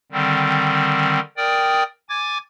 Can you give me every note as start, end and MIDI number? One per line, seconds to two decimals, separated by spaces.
0.12 1.19 50
0.12 1.19 51
0.12 1.19 55
0.12 1.19 60
1.37 1.83 70
1.37 1.83 74
1.37 1.83 79
1.37 1.83 87
2.09 2.38 80
2.09 2.38 86
2.09 2.38 92
2.09 2.38 93